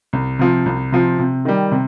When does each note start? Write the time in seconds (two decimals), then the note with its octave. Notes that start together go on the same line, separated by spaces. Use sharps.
0.13 C2
0.39 C3 F3
0.66 C2
0.92 C3 F3
1.19 C3
1.45 D#3 G3
1.71 C3